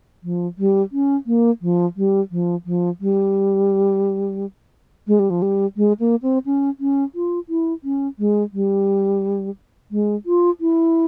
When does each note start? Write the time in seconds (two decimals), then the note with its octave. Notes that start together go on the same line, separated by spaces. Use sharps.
0.23 F3
0.58 G3
0.92 C#4
1.26 A#3
1.62 F3
1.96 G3
2.31 F3
2.65 F3
3.00 G3
5.07 G#3
5.19 G3
5.30 F3
5.42 G3
5.77 G#3
5.99 A#3
6.22 C4
6.45 C#4
6.80 C#4
7.15 F4
7.49 E4
7.84 C#4
8.19 G#3
8.53 G3
9.91 G#3
10.26 F4
10.60 E4